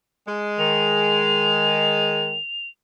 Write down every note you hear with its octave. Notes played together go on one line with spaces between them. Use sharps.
G#3
D#3 F7